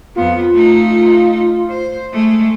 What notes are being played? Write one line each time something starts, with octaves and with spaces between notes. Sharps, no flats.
F2 B3 F4
A3 D#4
C5
G#3 A3